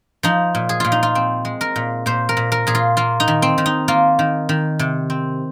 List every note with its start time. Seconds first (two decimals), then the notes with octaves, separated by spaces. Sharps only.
0.23 F3 D#4
0.55 A#2
0.69 G#4
0.80 A#2 F4
0.92 D#4
1.03 F4
1.15 C4
1.45 G#3
1.61 A#4
1.76 A#2
2.06 A#2 C5
2.29 A#4
2.37 A#2
2.52 A#4
2.67 A#2 G#4
2.75 F4
2.97 A#3 F4
3.20 D#4
3.28 D#3
3.42 C4
3.58 D#3
3.66 D#4
3.88 A#3 F4
4.19 D#3
4.49 D#3
4.79 C3
5.10 C4